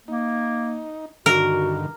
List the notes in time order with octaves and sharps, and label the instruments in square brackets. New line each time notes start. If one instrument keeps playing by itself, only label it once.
[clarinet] A#3 [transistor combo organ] D#4
[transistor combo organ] G2 D3 D#3 [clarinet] F#4 [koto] A#4